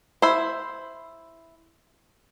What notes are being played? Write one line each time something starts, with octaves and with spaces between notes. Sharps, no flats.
E4 C5